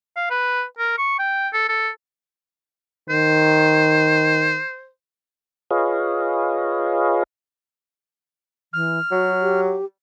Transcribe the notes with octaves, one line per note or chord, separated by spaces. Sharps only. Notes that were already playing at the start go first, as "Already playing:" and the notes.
F5
B4
A#4
C#6
G5
A4
A4
D#3 C5
F4 G#4 B4 C#5 D#5 F5
E3 F6
F#3 F#4
G4